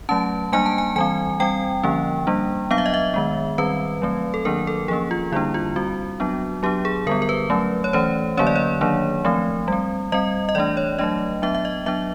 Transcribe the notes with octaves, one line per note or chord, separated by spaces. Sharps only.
F#3 A3 C#4 A5
G3 A#3 D4 G#5
A5
G#5
E3 G3 C4 G#5
G3 C4 G5
D3 F3 A#3 C#4
G3 A#3 D4
F#3 B3 D4 F5
E5
D#5
E5
D#3 G#3 B3
D#3 G3 C4 B4
F#3 A3 C4
A4
D#3 F#3 A#3 D4 A#4
A4
F3 A#3 C#4 G#4
F4
D3 G3 A#3 D4 E4
F4
G3 C4 F#4
F#3 B3 D4
F#3 B3 D4 G4
G#4
D3 G3 B3 A#4
A#4
B4
F#3 A3 C#4
C#5
E3 A3 C#4 C5
D3 F#3 A#3 C#4 C#5
D5
C#5
D#3 F#3 A#3 D4
F3 A3 C4
G3 C4
G3 C4 D#5
D#5
E3 A3 D4 D5
C#5
F#3 A3 D4 D#5
F#3 B3 D4 E5
E5
D#5
F#3 B3 D4 E5